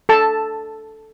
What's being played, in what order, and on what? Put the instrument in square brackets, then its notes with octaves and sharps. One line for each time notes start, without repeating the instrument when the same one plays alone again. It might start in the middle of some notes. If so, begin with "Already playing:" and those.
[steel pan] A4 A5